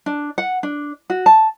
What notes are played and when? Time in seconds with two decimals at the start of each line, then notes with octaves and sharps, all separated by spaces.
0.06 D4
0.38 F#5
0.63 D4
1.10 F#4
1.26 A5